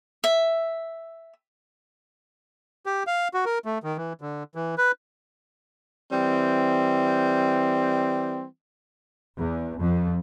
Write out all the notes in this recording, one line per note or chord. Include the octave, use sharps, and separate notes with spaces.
E5
G4
F5
F#4
A#4
A3
D#3
E3
D3
E3
B4
E3 G3 C4
E2
F2